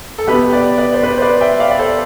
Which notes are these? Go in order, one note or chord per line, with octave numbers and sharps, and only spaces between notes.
A4
B2 B3 G4 B4
B4 D5
B4 D5
C5
B4 D5
C5
B4 D5
E5 G5
D5 F5
D5
A4 C5